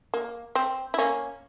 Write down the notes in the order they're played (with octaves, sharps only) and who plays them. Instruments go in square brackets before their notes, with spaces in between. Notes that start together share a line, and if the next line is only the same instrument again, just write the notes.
[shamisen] A#3
C4
E4
A#3 C#4